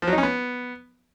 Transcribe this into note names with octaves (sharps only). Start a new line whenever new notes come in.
F3
F#3
D#4
C#4
B3